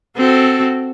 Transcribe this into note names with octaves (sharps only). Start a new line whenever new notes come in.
C4 F#4 A4